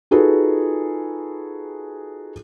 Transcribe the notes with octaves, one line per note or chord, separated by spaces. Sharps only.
D#4 F4 F#4 G#4 A4 B4